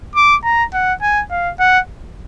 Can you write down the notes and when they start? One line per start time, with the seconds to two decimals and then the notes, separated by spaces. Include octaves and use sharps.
0.16 D6
0.44 A#5
0.74 F#5
1.02 G#5
1.31 F5
1.59 F#5